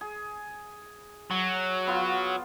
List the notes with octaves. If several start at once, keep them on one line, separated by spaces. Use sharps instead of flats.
G#4
F#3
B3 F4 F5